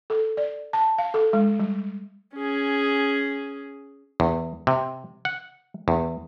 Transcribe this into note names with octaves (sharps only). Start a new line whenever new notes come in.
A4
D5
A5
F5
A4
G#3
G3
C#4 G#4
E2
C3
F#5
E2